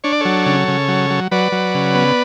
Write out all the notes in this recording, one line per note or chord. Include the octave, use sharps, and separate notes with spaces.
D4 C#5
D5
F#3 A4 C#5
C#3
C#3
F#3
F#3
F#3 B4 D5
F#3
C#3
B3